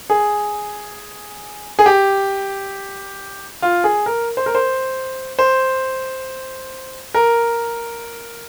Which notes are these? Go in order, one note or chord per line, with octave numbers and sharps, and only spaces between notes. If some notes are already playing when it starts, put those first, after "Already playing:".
G#4
G#4
G4
F4
G#4
A#4
C5
A#4
C5
C5
A#4